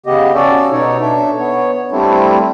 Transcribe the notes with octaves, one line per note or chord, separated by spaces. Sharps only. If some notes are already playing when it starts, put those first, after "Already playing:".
C#3 B3 G4 D#5
C#4 F#4 A4 D5
B2 D#4 C#5
D4 A4 E5
B3 C#5
G3 A3 C4 D4 E4